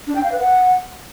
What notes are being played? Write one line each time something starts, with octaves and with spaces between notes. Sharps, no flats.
D4
G5
F5
B4
F#5